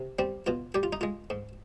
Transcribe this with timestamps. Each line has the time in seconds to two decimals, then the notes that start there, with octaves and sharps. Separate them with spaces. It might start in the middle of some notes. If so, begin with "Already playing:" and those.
Already playing: C3
0.19 G3 C4
0.47 B2 F4
0.75 G3 G4
0.83 F4
0.93 D#4
1.01 G#3 F4
1.30 G#2